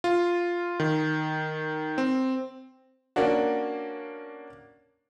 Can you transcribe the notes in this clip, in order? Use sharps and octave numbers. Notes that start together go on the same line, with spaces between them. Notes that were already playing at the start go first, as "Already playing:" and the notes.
F4
D#3
C4
A#3 C#4 D4 F#4